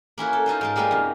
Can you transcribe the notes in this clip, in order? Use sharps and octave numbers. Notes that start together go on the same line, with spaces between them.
A#3 C#4 E4 F#4
A4
C#4 D#4 F4 C5
G#2 A#4 A5
G3 G#3 A#3 D#4 F4
F#2 C3